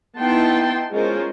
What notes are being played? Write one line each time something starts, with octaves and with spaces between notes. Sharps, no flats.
B3 D#4 E4 G5 A5 C6
G#3 C#4 F4 A#4 C5